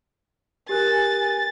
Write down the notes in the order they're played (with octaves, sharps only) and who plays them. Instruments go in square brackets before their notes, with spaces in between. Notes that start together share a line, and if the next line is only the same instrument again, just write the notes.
[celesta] G4 A#4 F#6 [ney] G#5 [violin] A6